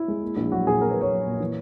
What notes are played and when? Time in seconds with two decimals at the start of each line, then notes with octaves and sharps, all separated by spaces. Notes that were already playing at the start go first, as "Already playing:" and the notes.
Already playing: E4
0.08 G#3
0.22 A#3
0.37 A#1
0.52 F#3 F#4
0.66 A#2 G#4
0.81 A#3 A#4
0.91 B4
0.96 A#1
1.01 C#5
1.11 F#3
1.25 A#2
1.40 E3